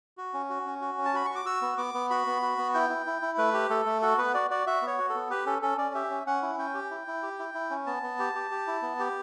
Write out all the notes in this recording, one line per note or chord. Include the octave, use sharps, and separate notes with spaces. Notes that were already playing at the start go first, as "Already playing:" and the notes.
F#4
C#4
F#4
C#4
F#4
C#4
A5
F#4 B5
C#6
F#4
D6
F#4 E6
B3
B3 D6
B3
F#4 B5
B3
F#4
B3
E4 G5
E4
E4
E4
A3 B4
G4
A3 A4
A3
F#4 A4
B3 B4
F#4 D5
F#4 D5
F#4 E5
B3
C#5
F#4
A4
B3
G4 B4
C#4 A4
C#4 A4
C#4 D5
G4 E5
C#4
C#4 F#5
E4
C#4 G5
G4
E4
E4
G4
E4
E4
C#4
B3 A5
B3
G4
G4
G4
E4
B3
G4